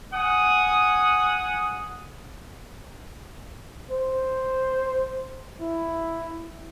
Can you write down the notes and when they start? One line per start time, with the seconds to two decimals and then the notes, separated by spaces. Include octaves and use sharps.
0.14 F#5 G#5 D#6
3.91 C5
5.61 E4